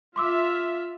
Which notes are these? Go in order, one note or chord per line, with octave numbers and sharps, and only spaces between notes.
F4 E5 C6 D6 E6